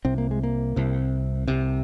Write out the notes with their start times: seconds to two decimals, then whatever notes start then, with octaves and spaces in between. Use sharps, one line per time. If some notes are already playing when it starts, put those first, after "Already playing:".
0.05 C2 C3 C4
0.18 A#3
0.31 G#3
0.43 A#3
0.76 C2 C3
1.48 C2 C3